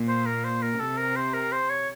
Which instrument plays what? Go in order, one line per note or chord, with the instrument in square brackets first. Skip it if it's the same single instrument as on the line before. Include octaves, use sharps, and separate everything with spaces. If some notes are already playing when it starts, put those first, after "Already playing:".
Already playing: [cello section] A#2
[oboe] C5
A#4
C5
A#4
[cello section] C3 [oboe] A4
[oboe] A#4
C5
A#4
C5
C#5